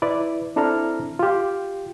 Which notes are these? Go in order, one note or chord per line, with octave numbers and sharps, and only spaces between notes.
E4 B4 D5
C4 D4 E4 A4 A#5 F6
F4 G4